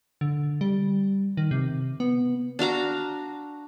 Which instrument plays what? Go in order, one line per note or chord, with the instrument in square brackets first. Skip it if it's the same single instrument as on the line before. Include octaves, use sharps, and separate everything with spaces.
[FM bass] D3
G3
D#3
C3
B3
[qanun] D4 F#4 F5 A#5